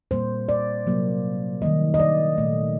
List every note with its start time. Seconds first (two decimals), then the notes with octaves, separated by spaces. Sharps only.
0.11 A#2 G3 A#3 C5
0.49 D5
0.86 C3 F#3 A#3
1.62 D#3 G3 A#3 D#5
1.94 D#5
2.00 D5
2.38 A#2 A3